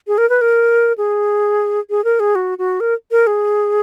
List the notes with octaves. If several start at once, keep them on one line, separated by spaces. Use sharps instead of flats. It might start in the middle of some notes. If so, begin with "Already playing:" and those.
G#4
A#4
B4
A#4
G#4
G#4
A#4
G#4
F#4
F#4
A#4
A#4
G#4